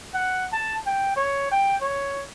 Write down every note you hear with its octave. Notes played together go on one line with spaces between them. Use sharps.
F#5
A5
G5
C#5
G5
C#5